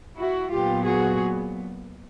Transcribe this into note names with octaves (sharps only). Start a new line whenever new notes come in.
E4 F#4
A#2 F#3 B3 F4 G4
F#4 G#4